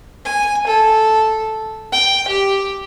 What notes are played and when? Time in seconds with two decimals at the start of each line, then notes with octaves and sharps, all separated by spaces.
0.25 G#5
0.67 A4
1.92 G5
2.28 G4